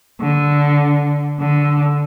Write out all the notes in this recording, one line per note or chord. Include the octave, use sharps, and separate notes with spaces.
D3
D3